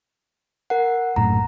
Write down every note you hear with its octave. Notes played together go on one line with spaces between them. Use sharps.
A#4 F#5
A#1 F#2 A2 A#5